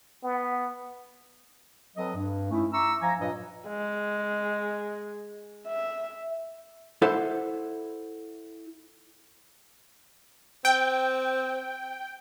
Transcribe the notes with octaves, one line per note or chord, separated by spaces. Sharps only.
B3
F#3 C4 A4 B4 D#5
G2
A3 C#4 D#4 E4
E5 A#5 C#6 D6 E6
F3 F5 G#5 A#5
G2 A#2 F#3 B4 D#5
G#3
E5
E4 A4 C5 F#5
C4 G5